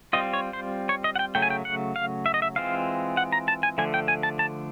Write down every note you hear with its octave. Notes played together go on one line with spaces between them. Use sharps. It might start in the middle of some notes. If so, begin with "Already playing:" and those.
G3 C4 F4 D#5
C#5
C5
C#5
D#5
F#5
G5
C#3 F#3 A3 G5
G#5
G5
F#5
F5
E5
D#5
E5
E3 G#3 C4 F4 F5
F#5
A#5
A5
G#5
D3 F3 A3 G#5
G5
G#5
A5
A5